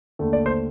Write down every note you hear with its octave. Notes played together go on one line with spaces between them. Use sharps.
D#2 D3 A3
D5
C5